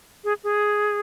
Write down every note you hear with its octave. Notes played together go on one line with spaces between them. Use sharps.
G#4
G#4